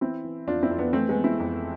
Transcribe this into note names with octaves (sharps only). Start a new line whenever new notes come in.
E3 C4 E4
E3
F2 D4 F4
C4 E4
F2
B3 D4
E3 A3 C4
G#3 B3
E3
C4 E4
F2